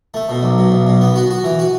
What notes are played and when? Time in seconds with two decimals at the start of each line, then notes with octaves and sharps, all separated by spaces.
0.14 A3
0.29 B2
0.43 B1
0.58 B2
0.72 B1
0.86 B2
1.01 B3
1.16 F#4
1.31 F#4
1.44 E3
1.59 F#4